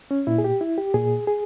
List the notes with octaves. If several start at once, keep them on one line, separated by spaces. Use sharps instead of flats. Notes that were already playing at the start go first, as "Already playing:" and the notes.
C#4
A#2 E4
G#4
G4
E4
G4
A#2 G#4
G#4